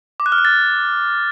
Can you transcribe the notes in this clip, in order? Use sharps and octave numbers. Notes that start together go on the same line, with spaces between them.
D6
F#6
F6
F#6
A6